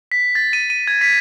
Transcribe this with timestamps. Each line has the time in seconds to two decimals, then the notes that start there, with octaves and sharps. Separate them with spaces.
0.12 B6
0.35 A6
0.53 D#7
0.70 D#7
0.88 G#6
1.01 B6